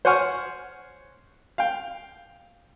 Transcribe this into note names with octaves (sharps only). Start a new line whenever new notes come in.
C5 C#5 F#5 G#5 C#6 F6
F5 G5